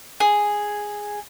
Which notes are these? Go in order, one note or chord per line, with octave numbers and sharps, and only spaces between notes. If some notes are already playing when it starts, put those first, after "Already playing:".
G#4